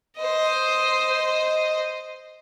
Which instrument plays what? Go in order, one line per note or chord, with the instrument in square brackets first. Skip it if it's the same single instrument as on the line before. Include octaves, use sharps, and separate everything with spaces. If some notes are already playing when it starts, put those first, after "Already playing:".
[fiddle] C5 D#5